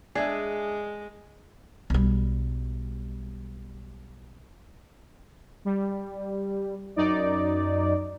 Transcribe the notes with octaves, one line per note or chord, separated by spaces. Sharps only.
G#3 D4 G#4 E5
B1 G3
G3
F#2 D#4 D5